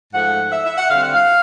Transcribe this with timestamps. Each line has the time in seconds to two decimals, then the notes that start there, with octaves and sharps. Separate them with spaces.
0.13 G#2 F3 A3 F#5
0.52 E5
0.64 E5
0.78 F#5
0.90 D3 G3 C4 F5
1.02 F#5
1.14 F5